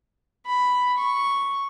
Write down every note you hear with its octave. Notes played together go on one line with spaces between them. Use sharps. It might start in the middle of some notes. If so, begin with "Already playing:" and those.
B5
C#6